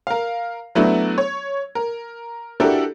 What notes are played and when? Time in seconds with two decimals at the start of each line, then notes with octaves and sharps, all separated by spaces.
0.07 A#4 F5
0.75 F#3 A3 B3 D4 E4 F#4
1.18 C#5
1.75 A#4
2.60 D4 E4 F#4 G4 A4 A#4